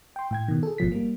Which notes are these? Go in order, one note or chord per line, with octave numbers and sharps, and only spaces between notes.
G5 C6
A2 G5 G#6
B2 D#3
G#4 A4
G#1 B2 F3 B6
G3 A#3